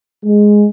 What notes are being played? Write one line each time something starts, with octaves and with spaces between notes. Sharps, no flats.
G#3